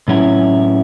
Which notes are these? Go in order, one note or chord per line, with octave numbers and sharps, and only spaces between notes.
A2 F#3 C#4 E4